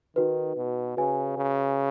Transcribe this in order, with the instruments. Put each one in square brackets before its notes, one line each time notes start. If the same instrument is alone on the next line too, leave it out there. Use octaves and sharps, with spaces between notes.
[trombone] D#3 [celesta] D#4 F#4 B4
[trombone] B2
[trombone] C#3 [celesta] F#4 B4 D#5 G#5
[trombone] C#3